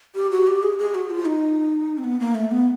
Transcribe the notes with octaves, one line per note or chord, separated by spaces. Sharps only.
G4
F#4
G4
G#4
G#4
F#4
F4
D#4
C4
B3
A#3
A3
B3